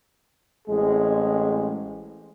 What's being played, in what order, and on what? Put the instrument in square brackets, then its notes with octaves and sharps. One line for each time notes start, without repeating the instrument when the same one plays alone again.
[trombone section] A1 G#3 C4 G#4